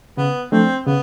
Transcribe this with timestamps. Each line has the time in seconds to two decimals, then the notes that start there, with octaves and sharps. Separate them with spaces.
0.17 C#3 B3
0.52 F3 A3 C4 D4
0.86 C#3 B3